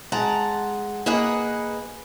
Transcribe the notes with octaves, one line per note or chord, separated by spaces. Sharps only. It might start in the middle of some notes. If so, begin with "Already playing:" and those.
G#3 F#5 A5 A#5
A#3 G#4 B4 D#5 F#5